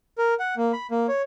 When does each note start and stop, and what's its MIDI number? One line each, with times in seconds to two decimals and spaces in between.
0.18 0.34 70
0.39 0.55 78
0.57 0.72 58
0.73 0.87 83
0.91 1.07 58
1.08 1.22 73